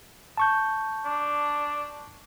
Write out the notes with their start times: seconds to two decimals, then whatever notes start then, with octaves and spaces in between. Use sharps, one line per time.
0.37 A5 C#6 G6
1.04 D4